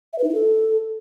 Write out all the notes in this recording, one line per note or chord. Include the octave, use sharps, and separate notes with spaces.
E5
B4
D#4
E4
A4